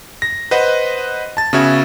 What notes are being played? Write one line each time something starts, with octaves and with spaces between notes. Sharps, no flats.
A#6
B4 C5 D#5 F#5
A5 A6
C#3 B3 F#4 E5 G#6